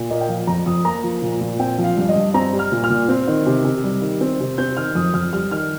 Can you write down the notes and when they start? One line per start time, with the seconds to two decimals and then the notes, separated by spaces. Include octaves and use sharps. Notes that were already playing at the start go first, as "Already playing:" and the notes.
Already playing: A#2
0.10 A#3 D#5
0.21 G5
0.29 F3 F5
0.47 F2 A#5
0.66 F2 D#6
0.85 A#3 A#5
1.04 F3
1.22 A#2
1.41 A#2
1.59 C4 G5
1.78 F3
1.84 F5
1.97 G2 F5
2.09 D#5
2.16 G2
2.34 C4 A#5
2.53 G3
2.59 F6
2.72 A#2
2.84 F6
2.90 A#2
3.09 C4
3.28 D#3
3.46 C3
3.64 C3
3.83 G3
4.02 D#3
4.21 C4
4.40 C3
4.58 C4 G6
4.77 D#3 F6
4.95 F2 D#6
5.14 F2 F6
5.33 G3 F6
5.51 D#3 F6